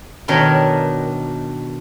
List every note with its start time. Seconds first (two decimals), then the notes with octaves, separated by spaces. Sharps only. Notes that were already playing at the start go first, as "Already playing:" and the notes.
0.28 B2 D#3 D4 A#4 C#5